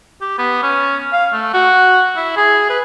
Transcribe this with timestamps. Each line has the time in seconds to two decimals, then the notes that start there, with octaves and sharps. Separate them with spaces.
0.21 G4
0.38 B3
0.63 C#4
1.13 F5
1.33 A3
1.54 F#4
2.16 E4
2.37 G#4
2.69 B4